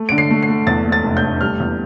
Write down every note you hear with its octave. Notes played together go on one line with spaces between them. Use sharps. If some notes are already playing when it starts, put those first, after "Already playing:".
Already playing: A3
D3 D7
C7
A3
C7
A3
E2 A6
A3
A6
F1
G6
A3
G3 F6
E2